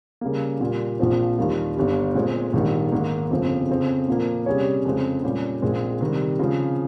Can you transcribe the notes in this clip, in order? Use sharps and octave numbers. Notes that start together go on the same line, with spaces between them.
C#3 G3 A#3
A#2 G3 A#3
A#1 A#2 F3 C4
D#2 D#3 G3 A#3 F4
G1 G2 G3
A#2 G#3 C4
A#1 G#2 D#3 G3
G#2 D#3 A#3
G1 F2 C#3 F3 C4
F2 C#3 F3 C4
A#2 F3 A#3
C3 G3 C#4 G#4 C#5
F2 C#3 G#3 C4
A#2 G3 C#4 G4
A#1 A#2 G#3 C4
C3 D#3 G3
C#3 F3 G#3 C4